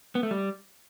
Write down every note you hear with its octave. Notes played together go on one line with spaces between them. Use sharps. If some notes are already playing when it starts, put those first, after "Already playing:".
B3
A3
G3